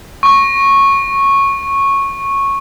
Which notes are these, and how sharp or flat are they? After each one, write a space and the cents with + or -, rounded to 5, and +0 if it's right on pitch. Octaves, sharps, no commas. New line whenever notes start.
C#6 -10